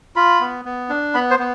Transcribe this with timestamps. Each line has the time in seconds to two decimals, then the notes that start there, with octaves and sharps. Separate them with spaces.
0.16 F4 B5
0.41 B3
0.65 B3
0.89 D4
1.14 B3 B5
1.31 C5
1.39 B3